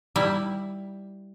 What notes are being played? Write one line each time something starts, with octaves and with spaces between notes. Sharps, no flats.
G3 E4